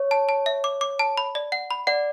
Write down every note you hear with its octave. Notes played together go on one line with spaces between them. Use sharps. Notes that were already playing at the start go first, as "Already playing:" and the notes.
Already playing: C#5
A5
A5
E5
D6
D6
A5
B5
D5
F#5
B5
D5 F#5